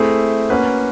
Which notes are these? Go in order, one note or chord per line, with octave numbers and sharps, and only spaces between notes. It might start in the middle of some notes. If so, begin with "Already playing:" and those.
Already playing: A3 C4 E4 G#4
A#3 C#4 F#4 B4